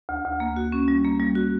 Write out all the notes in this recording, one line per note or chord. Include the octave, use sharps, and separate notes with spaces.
D2
D2
A#3
F#4
C#4
G3
A#3
G3
F#4